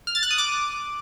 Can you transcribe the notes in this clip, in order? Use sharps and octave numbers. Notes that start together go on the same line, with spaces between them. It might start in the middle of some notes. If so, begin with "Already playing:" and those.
F6
A6
F#6
D#6
D6